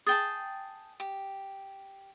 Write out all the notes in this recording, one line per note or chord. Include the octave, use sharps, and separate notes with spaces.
G#4 G5 A5 D#6 A6
G4